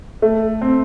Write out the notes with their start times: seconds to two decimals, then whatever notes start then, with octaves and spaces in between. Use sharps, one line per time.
0.22 A3
0.61 C4